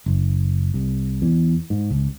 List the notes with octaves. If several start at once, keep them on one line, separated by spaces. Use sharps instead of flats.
F#1
C2
E2
G#2
C#2